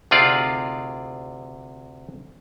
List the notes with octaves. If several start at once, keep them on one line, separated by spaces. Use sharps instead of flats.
D2 C3 D#4 F4 G#4 D5